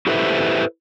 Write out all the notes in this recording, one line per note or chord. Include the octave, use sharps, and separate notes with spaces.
E4 G4 A4 B4 C5 E5